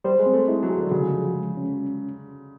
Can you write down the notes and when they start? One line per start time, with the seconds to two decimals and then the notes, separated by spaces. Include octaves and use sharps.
0.04 G3 C5
0.19 G#3
0.26 C4
0.33 A3
0.48 G#3 E4
0.63 F#3
0.70 G#4
0.78 D3
0.91 C#3 F#4
1.14 F3
1.35 G#3
1.57 C#4